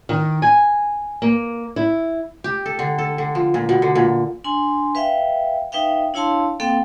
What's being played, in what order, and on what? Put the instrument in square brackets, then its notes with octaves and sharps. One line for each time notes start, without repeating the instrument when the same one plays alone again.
[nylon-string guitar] D#3
G#5
A#3
E4
[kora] G4
A4
D3
A4
D3
F3
A#2
B2
D3
A#2
[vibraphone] D4 G#5 C6
B4 E5 F5 G5
D#4 B4 E5 F5 G5
D4 E4 C#5 F5 A5 C6
A#3 C4 A4 F5 G5